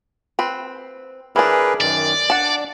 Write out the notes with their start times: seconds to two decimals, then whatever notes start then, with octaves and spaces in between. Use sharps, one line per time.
0.39 C4 B4
1.36 E3 D4 G#4 A#4 B4
1.81 F#2 D#3 D5
2.30 D4 F#5 A5